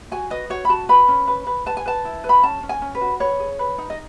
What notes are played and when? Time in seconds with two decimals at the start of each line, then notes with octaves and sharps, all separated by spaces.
0.11 F#4 G#5
0.30 B4 D#5
0.50 F#4 C#5
0.65 B5
0.69 F#4 A5
0.89 B4 B5
1.08 C#4
1.28 B4
1.47 B4
1.66 B4 A5
1.77 G#5
1.86 B4 A5
2.05 E4
2.24 B4
2.29 B5
2.43 C#4 A5
2.63 C#4
2.69 G#5
2.82 C#4
2.95 B4
3.01 F#4
3.20 B4 C#5
3.40 G#4
3.59 B4
3.78 D#4
3.90 D#5